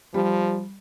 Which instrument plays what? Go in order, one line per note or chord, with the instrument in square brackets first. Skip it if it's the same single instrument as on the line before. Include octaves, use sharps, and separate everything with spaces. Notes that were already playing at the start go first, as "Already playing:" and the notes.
[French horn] F3 [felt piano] G3